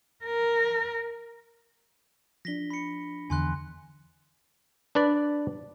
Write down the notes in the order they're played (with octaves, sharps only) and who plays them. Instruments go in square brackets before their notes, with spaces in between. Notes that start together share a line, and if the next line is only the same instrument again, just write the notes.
[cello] A#4
[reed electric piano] F3 D4 [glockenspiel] A#6 B6 G7
[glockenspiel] B5 C#7
[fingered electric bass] E2 D3 [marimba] E3 [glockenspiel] G#5 C6 F#6
[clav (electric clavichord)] D4 B4 D5